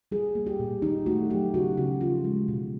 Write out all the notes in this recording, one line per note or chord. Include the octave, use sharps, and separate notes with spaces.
G3 G#4
A#3
G4
A#2
D#3 D#4
A3 F#4
F#3 G4
C#3 F#4
C#3 F#4
F3 F4
G#3
B2